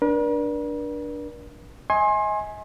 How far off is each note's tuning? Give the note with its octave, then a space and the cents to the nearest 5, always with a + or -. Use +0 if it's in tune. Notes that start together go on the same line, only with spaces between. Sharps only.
D4 +0 A#4 +45
D#5 +35 G#5 +5 C6 +30